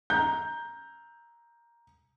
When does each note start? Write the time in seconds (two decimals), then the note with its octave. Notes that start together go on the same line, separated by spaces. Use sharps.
0.10 A#5 G6